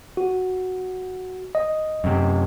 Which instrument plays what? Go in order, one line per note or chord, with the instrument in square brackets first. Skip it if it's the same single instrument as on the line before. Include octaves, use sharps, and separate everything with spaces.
[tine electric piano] F#4
D#5
[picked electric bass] F#2 C3